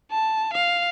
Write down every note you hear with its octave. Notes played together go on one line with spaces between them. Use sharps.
A5
F5